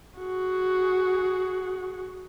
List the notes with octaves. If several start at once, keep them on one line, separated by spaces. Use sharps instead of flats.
F#4 G#4